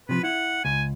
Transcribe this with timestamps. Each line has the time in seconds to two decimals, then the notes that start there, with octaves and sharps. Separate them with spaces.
0.09 C3 F3 B4
0.23 E4 F#5
0.65 C#2 G#5